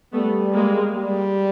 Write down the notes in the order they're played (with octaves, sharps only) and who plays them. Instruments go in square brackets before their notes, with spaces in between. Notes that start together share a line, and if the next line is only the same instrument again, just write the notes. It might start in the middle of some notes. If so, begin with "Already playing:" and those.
[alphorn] G3 [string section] A3 B3
[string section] G#3 A#3
[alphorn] G3